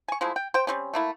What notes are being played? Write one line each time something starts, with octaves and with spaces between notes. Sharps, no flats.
G#5 C#6
F3 G#3 A3 E4
G5
C5 G5
G3 C4 C#4
A3 A#3 E4